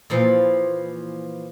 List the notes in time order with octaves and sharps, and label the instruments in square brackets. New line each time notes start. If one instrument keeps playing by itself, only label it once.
[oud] A#2 E3 F3